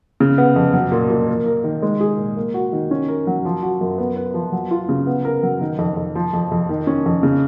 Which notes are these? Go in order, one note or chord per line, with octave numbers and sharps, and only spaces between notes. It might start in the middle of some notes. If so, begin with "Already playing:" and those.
C#3
B3
F2
F#3
A#2
A#2
A#3
A#4
D#3
G#3
G#4
A#2
A#3
F#4
D#3
C#4
A#4
F#3
F3
F#4
F#2
B3
B4
F3
F#3
F4
C#3
B3
A#4
F#3
D#3
F2
F2
F3
F2
F2
D#3
C#4
F2
C#3